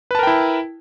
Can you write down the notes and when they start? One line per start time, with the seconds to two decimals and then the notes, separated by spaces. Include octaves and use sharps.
0.11 B4
0.15 A5
0.19 A#4
0.23 G5
0.27 E4